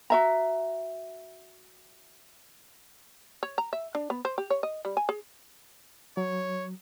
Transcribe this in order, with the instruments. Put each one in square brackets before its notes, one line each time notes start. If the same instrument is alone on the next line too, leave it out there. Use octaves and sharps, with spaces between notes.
[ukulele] F#4 E5 A#5
[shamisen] C#5
A#5
E5
D4
B3
C5
G4
C#5
D#5
G3
G#5
G#4
[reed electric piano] F#3 [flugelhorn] C#5